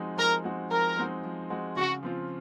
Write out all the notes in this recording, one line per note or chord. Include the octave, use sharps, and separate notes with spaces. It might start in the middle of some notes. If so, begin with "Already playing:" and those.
Already playing: F3 G#3 C4 D#4 F#4
F3 A#4
G#3 C4 D#4 F#4
F3 A#4
G#3 C4 D#4 F#4
F3
G#3 C4 D#4 F#4
C#3 F#4
F3 C4 F4